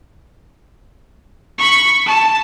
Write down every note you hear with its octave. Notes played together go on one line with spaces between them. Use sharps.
B5 C#6
A5